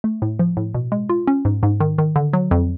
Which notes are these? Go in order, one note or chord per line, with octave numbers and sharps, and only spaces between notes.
A3
A2
F3
A2
B2
G#3
F4
C#4
G#2
G#2
D#3
D#3
D3
F#3
F2